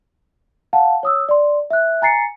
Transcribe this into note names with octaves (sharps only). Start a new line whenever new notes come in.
F5 F#5 A5
C#5 D#6 E6
D5 C6
E5 F#6
G#5 A#5 A6 C7 C#7